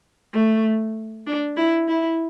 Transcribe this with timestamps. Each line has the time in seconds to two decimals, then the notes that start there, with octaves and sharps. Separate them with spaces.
0.34 A3
1.27 D4
1.57 E4
1.88 E4